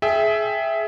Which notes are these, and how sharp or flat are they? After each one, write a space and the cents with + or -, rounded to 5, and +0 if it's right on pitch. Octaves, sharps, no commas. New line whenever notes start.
G#4 +25 E5 +0 G5 +15